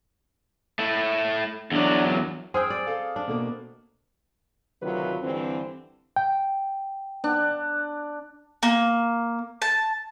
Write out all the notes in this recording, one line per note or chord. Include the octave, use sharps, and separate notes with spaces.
A3 E4
E2 F#3 D4
C4 G#4 G5 G#5 D#6 F6
D5
A4 F5
D4
B2 A3 A#3
D2 C3 D#3 F#3 F4 B4
G2 D3 E3 C4
G5
D4
A#3
A5